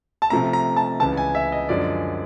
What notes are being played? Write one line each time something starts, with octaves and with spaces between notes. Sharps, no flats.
A5
C3 F3 A3 A#5
A#5
A5
C#2 C#3 E3 A5
G#5
E5
D#5
F#2 D3 F3 G#3 D5